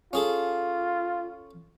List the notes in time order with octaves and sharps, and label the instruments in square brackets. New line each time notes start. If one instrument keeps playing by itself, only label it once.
[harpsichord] C#4 G#4 A4 [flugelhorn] F4